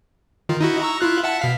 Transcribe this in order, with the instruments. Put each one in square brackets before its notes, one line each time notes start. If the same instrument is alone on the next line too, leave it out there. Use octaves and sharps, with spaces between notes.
[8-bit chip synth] D#3 F4
D#4 E4 F#4
A#5 C#6 E6
E4 F4 F#6
E5 F#5 A5
B2 F5 B6